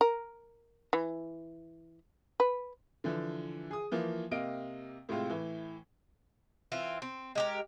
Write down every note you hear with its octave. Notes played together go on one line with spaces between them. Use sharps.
A#4
E3
B4
D3 E3 F3
G#4 D#6
E3 F3 A#3
C3 A#3 D#5 F5 D7
A2 C3 G#3 C4 F4
A2 E3
E3 C4 F4
C4
G#3 G4 A#4